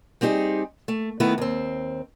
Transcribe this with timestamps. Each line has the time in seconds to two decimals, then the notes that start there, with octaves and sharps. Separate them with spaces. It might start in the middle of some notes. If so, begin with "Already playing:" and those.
0.21 G3 C4 D#4 G4 G#4
0.88 A3
1.20 D#3 A3 B3 E4 B4
1.38 D#2 C4